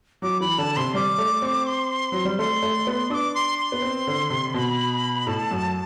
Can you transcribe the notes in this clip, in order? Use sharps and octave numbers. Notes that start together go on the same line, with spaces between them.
F#3 D6
E3 B5
D3 A5
C3 C6
G3 D6
A3
C4
C6
F#3
G3
A3 C6
A3
B3
D4 D6 E6
C6
C6
B3
C4
D3
C3
B2 B5 C6
A2 A5
F#2